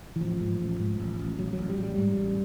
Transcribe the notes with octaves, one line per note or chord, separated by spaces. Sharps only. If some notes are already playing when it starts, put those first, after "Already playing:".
E3
A1 F3
G#2
A1
G#2
A1
A1
A1 F#3
F#3
A1
G3
A1
G3
G#2
A1